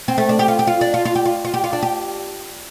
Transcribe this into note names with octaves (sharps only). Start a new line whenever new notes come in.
C4
A3
D4
G4
F4
G4
F4
D4
F4
F4
G4
F4
F4
G4
F4
D4
G4